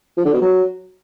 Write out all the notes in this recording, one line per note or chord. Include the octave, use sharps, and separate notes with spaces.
F3
D3
B2
F#3